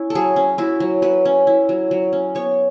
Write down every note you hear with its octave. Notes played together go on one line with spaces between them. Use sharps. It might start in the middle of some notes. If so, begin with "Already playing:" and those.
Already playing: C#4 E4
A4
F#3 G#4
C#4
E4 F#4
F#3
F#3 B4
C#4
E4
F#3
F#3
C#4
B3 C#5